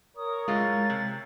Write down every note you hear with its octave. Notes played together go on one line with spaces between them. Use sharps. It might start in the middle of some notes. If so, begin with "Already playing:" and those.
A#4 C#5 D#6
F#2 A2 G#3 F4 A6
C3